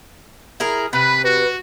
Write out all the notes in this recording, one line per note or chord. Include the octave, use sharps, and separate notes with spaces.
E4 G#4 A#4
C3 B4 B5
F#4 B4